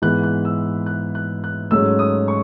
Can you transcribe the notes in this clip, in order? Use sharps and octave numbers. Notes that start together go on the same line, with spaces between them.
G#2 E3 B3 F#6
F#6
E6
F#6
F#6
F#6
G#2 F#3 A3 C#4 E6
D#6
C#6